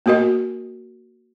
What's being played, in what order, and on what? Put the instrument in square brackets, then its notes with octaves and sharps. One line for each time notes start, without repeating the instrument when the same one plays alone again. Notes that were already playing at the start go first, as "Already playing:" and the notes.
[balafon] A#3 B3 F#4 A#4 D#5